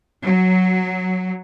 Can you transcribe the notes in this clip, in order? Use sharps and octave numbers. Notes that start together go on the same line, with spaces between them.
F#3